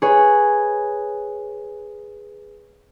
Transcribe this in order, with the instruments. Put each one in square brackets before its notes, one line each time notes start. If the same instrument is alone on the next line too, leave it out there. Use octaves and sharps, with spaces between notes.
[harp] G#4 B4 C#5